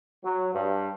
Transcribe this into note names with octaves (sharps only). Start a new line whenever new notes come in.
F#3
G2